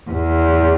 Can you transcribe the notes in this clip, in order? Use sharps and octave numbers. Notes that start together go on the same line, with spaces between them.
E2